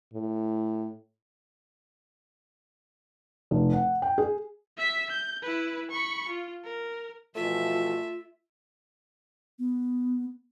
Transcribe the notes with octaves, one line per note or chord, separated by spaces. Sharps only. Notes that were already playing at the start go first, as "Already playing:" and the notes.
A2
F1
F#5
G5
G#4
E5 B6
G6
E4 B4
B5 C#6
F4
A#4
B2 E3 F3 A3 F4 E5
B3